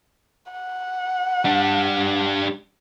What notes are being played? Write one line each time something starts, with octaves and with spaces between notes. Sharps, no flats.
F#5
G3 D4